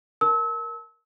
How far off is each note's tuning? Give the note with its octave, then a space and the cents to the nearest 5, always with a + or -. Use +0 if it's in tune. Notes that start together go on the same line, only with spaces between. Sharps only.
A#4 +5 A5 +0 E6 -35